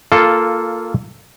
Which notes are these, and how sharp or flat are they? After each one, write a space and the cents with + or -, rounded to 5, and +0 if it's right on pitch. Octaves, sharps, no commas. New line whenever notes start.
A#3 -15 F4 +0 A4 +0